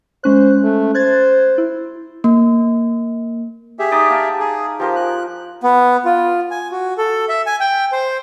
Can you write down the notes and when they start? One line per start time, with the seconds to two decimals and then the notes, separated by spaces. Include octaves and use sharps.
0.24 G#3 C#4 C5 F#6
0.63 A3
0.94 C5 F#6 G#6 A6
1.58 E4
2.24 A#3
3.79 G4 G#4 E5
3.91 D#4 D5 D#6
4.10 F5 A5 A#5
4.40 G#4 G#5
4.80 F3 G4 A#4 C5
4.96 F#6
5.63 B3
6.05 F4
6.51 G#5
6.72 F#4
6.98 A4
7.29 E5
7.46 G#5
7.60 G5
7.92 C5